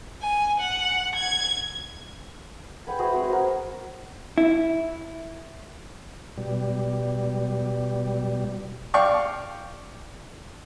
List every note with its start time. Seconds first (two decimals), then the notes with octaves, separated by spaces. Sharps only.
0.22 G#5
0.60 F#5
1.15 G#6
2.87 G#4 B4 F#5 G5
2.99 E4 F#4 G#4 C5
3.12 G#3 C4 F#4 C6
3.28 F#4 A#4
4.38 E4
6.38 B2 G3
8.94 D5 F5 G5 C#6